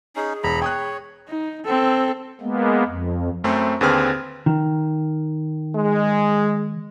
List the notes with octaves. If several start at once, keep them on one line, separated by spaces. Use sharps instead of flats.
C#4 D#4 G#4
E1 A#5 B5
C#5 G5 D#6 F#6
D#4
C4 A4
G#3 A#3 B3
F2
F#2 A3 C4
D#2 D3 C4 G#4 B4 F6
D#3
G#3